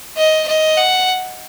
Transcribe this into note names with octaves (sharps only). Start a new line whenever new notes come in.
D#5
D#5
F#5